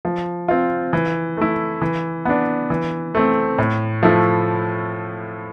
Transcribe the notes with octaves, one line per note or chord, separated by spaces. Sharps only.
F3
C4 F4
E3
A3 E4
E3
B3 D4
E3
A3 C4
A2
F3 A3 E4